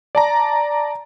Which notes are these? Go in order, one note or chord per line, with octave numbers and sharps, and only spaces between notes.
D5 A5 A#5